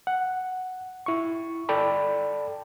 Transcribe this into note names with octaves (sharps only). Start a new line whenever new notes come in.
F#5
E4 C#6
A4 D5 G5 A5 B5